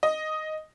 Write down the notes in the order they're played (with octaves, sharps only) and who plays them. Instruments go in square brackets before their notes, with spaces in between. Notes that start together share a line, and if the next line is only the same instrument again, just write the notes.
[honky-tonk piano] D#5